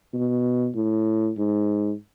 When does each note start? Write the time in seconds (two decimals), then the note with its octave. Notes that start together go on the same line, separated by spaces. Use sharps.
0.14 B2
0.75 A2
1.37 G#2